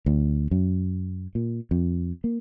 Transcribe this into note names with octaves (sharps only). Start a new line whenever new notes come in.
D2
F#2
A#2
F2
A#3